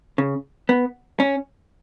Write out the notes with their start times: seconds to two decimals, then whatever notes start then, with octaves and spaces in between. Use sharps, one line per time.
0.18 C#3
0.69 B3
1.20 C#4